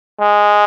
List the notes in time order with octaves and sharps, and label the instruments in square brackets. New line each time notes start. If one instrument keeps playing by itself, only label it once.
[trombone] G#3